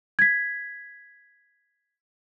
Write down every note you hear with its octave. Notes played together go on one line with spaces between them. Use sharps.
G#6 B6